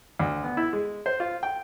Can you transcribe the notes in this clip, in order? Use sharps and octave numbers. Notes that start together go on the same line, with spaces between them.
D2
B3
E4
G#3
C5
F4
G5